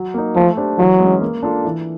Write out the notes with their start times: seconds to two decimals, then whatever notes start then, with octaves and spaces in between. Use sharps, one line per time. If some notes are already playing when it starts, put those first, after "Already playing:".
Already playing: F#3
0.14 A#3 D#4
0.36 F3 A3
0.57 D4 G4 C5
0.79 E3 F#3
1.00 G#3 C#4
1.21 A#3
1.43 D4 F4 A4
1.65 E3